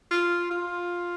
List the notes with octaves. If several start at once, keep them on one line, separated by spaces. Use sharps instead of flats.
F4
F4